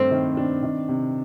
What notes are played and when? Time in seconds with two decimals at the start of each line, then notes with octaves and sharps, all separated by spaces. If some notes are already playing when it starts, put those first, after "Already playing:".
Already playing: G2 D#3 A3 C4 D4
0.11 D#3
0.37 D4
0.63 D#3
0.89 C3